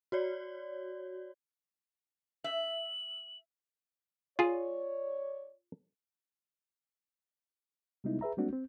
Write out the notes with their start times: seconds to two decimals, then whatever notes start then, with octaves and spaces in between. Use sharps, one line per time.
0.12 F#4 C#5 D5
2.44 E5 F#7
4.39 F4 G#4 C#5 D5
8.04 C3 G3 G#3 B3 D#4 E4
8.21 G#4 B4 E5 A#5
8.37 G3 G#3 A#3 C4 D4 F#4
8.53 C4